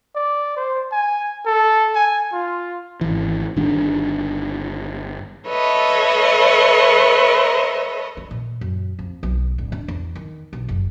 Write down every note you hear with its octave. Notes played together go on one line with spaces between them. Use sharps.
D5
C5
G#5
A4
G#5
F4
G#1 E3
G1 D#3 G3 D4
A4 B4 C#5 D#5 E5
G3
A#2
F#2
F2
B1
D1
D4
E2
D#3
B1
F#1